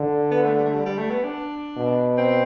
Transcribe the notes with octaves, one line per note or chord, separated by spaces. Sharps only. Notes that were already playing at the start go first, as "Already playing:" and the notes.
Already playing: D3
B3
A3
G3
A3
G3
G3
A3
B3
D4
B2
C4